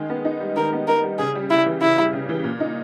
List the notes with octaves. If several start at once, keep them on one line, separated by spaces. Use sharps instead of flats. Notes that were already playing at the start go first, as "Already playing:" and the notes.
Already playing: D#3 G#3
B3
D#4
G3
D#3 A#4
B3
D#4 A#4
G3
C#3 G#4
G3
C#3 E4
E3
C#3 E4
G3
C#3
E3
A#2
D#4